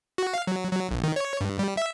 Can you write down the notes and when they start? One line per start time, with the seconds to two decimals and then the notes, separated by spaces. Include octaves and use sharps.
0.18 F#4
0.34 F5
0.47 F#3
0.72 F#3
0.91 A#1
1.04 D#3
1.16 C#5
1.41 G2
1.59 G3
1.77 E5